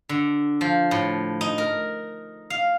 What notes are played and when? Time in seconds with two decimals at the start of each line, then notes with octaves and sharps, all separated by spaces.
0.09 D3
0.61 F3
0.91 A2
1.41 D#4
1.58 A#4
2.50 F5